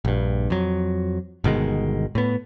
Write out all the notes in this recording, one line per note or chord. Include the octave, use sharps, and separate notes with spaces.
A#1 G2
F2 F#3
G1 B2 D#3 G#3
A2 B3